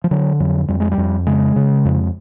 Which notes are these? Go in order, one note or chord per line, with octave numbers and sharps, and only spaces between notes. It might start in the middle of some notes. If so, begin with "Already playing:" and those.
F3
D3 F#3
F2 F#3
F2 G3
G#3
G3
F2
C#3 G#3
C#3
F2